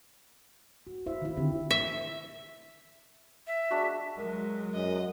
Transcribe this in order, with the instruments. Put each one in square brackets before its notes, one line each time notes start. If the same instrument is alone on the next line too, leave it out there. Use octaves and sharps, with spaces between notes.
[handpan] F#4
E4 C5 E5 F5
D#3 E4
D3 C4 F4 G4
[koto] E5
[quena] E5
[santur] G#3 D4 F#4
[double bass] F#3 G#3 [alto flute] A#4
[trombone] F#2 [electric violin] D#5